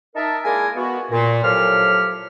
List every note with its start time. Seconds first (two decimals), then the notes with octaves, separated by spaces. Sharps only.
0.15 D#4 A#4 E5 A5
0.44 G#3 A#3 E4 A#4 D5 G#5
0.76 B3 F#4
1.11 A#2
1.44 A2 F3 F#3 G4 C#5 F6